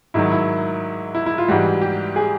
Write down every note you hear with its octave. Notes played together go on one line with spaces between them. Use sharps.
G#2 D#3 F#3 E4
E4
E4
E4
F4
G#2 E3 G3 F#4
G4
G#4